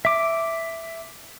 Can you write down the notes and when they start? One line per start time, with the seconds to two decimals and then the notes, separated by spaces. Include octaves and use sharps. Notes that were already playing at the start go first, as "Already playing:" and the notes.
0.05 E5 D6